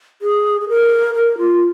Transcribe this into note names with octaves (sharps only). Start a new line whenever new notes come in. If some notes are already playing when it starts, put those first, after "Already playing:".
G#4
G#4
A#4
A#4
F4